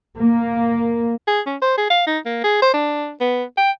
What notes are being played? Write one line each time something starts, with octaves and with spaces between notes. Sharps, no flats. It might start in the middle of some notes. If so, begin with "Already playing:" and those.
A#3
G#4
C#4
C5
G#4
F5
D#4
A#3
G#4
C5
D4
B3
G5